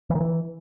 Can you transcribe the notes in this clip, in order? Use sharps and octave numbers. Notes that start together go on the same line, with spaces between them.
E3
D#3
E3